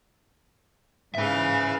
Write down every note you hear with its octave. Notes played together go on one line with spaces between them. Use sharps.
G#2 C#3 B4 E5 F5